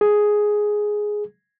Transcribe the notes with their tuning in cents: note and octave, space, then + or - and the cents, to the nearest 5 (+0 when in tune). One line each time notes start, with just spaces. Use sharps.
G#4 +5